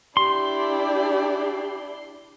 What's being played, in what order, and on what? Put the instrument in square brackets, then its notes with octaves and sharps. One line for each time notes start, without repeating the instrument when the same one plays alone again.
[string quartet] D4 E4 D5 [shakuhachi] G4 [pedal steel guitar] C6